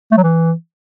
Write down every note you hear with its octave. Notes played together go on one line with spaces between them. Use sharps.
A3
F#3
E3